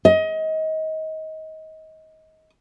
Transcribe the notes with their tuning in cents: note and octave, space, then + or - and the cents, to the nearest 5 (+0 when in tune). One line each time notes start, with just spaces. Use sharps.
D#5 +25